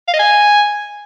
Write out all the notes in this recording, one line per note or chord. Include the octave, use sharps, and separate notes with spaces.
F5
D#5
G#5